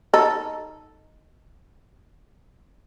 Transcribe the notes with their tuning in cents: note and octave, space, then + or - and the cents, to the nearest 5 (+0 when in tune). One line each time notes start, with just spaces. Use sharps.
D#4 +0 A4 +0